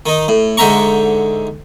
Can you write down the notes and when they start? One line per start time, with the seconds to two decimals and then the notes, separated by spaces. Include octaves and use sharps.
0.06 D#3 D#4
0.28 A2
0.57 G#2 D3 C5 E5 A#5 C#6